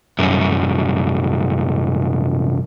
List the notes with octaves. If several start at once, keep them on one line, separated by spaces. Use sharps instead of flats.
C2 F#2